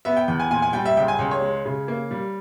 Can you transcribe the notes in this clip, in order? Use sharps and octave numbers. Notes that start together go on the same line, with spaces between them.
B3 E5
G5
E2 G5
G#5
A#2 G#5
G#5
G3 G5
E5
C#2 G5
G#5
C#2 G5
C#5
G#3
C#3
A#3
G3